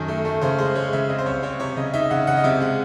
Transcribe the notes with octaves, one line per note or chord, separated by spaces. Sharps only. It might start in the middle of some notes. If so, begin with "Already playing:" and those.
Already playing: F#2 D#3 A4
A3
A3
C#3 C5
G#3 C5
G#3 C#5
C#3 E5
C4 D#5
C5
C2 C#5
C4 C#5
C3 C#5
C#3 D#5
D#4 E5
C#3 F#5
C#3 F#5
D#5
C3 E5
G#3 F#5